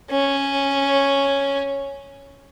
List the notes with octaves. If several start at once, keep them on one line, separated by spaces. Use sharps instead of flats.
C#4 C#5